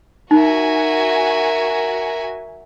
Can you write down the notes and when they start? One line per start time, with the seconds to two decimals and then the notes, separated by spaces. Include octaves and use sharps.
0.31 D#4 F#4 A#4 E5 G#5